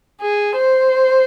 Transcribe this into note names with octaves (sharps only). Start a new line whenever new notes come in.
G#4
C5